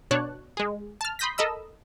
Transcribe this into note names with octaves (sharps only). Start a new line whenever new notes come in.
B2 D4 C#5 D5 A5 F#6
G#3 G#4
A5 F6
B5 C6 D#6 G6 A#6 B6
A4 A#4 D#5 B5 E6